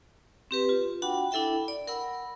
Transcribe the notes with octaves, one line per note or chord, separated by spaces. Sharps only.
C4 G4 B4
F4
D4 F#4 F#5 G5 B5
D4 E4 A4 E5 G5 B5
D5
A#4 F#5 B5 E6